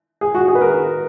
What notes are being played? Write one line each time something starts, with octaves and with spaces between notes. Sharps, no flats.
G#4
F#4
G#4
B4
A#4